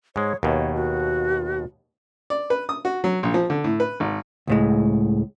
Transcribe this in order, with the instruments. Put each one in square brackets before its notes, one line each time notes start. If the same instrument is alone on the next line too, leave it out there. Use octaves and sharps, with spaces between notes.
[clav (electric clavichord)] G#2 G#3 [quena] C#5
[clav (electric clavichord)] D#2 B2 [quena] C#5
[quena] F#4
[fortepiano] D5
B4
D#6
F#4
F#3
A#1
F3
D3
A2
B4
G#1
[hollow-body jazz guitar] C#2 A2 G#3